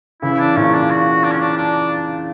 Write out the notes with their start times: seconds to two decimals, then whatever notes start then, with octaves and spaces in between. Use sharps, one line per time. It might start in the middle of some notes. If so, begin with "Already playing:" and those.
0.22 C#3 E3 E4
0.39 D4
0.56 A#2 C#3 C#4
0.74 D4
0.91 F#4
1.24 D4
1.32 C#4
1.40 D4
1.57 D4